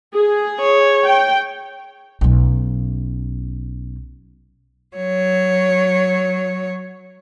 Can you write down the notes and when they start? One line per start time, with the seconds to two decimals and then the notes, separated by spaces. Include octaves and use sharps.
0.14 G#4
0.61 C#5
1.05 G5
2.21 B1 C#4
4.97 F#3 C#5